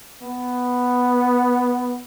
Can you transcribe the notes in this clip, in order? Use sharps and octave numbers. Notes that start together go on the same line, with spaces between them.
B3